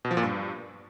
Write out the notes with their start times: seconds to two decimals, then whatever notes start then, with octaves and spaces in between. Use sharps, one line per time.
0.05 B2
0.11 F3
0.17 A#2
0.23 G2